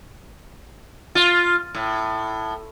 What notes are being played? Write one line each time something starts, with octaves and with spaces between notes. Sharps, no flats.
F4
A2